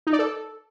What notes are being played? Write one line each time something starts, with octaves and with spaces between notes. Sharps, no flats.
D#4
D5
A4